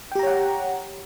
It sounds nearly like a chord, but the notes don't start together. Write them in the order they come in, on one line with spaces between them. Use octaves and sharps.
G5 G4 A#5 C#5 F#5